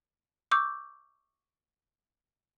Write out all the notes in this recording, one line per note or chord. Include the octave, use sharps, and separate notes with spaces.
C#6 D6 E6 G6